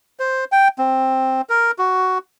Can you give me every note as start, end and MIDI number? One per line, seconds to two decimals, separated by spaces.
0.19 0.45 72
0.52 0.68 79
0.78 1.41 60
1.49 1.71 70
1.78 2.18 66